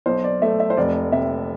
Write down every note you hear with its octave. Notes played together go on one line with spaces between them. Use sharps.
B1 C5
D5
A3 E5
E5
C5
F1 D5
C3 E5